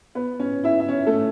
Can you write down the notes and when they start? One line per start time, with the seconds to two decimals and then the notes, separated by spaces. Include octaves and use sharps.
0.15 B3 B4
0.39 C#4 C#5
0.64 E4 E5
0.80 E5
0.88 C#4 C#5
1.06 A3 A4